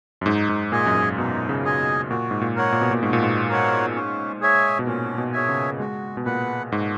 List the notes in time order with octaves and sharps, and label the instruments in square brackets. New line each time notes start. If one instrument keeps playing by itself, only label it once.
[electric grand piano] F#2
[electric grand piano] G#2 [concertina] D#4
[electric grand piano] G#2
[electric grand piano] A#2 [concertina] G#4 D#5 G#5
[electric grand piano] F#2
G#2
[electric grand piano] B2 [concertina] D#4
[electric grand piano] C#3
[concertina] G#4 D#5 G#5
[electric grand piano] B2
[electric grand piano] A#2 [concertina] F#4
[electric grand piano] G#2
A#2
[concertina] A#4 C#5 F#5
[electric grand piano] A#2
B2
A#2
[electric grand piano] G#2 [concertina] F#4
[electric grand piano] A#2
G#2
[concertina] A#4 C#5 F#5
C#4
G#4 C#5 E5 G#5
[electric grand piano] B2
[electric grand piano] A#2 [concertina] C#4
[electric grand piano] B2
[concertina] G#4 C#5 E5 G#5
[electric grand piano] C#3
[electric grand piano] G#3 [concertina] F#4
[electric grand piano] B2
[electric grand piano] A#2 [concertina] B4 F#5
[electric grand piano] G#2 [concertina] F#4